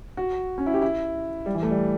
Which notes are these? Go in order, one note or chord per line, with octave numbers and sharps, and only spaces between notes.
F#4
C#4
E4
G4
E4
G3
E3
A3
G3